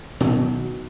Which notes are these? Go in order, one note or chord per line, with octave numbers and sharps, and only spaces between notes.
B2 D#3 F#3